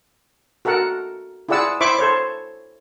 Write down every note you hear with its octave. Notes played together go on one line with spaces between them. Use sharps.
F#4 A4 A#4 F#5
E4 F4 G#4 D5 F#5 E6
E4 C5 E5 B5 C#6 D6
A4 C5 C#5